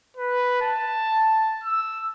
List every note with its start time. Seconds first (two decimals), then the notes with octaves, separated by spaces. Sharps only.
0.17 B4
0.62 A5
1.64 E6